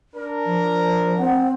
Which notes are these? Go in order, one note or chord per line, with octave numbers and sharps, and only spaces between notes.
D4 A#4
F3
C4 F#5